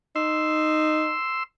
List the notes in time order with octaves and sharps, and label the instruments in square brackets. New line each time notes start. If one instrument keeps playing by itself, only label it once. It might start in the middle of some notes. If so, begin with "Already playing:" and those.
[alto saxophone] D#4 [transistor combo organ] C6 E6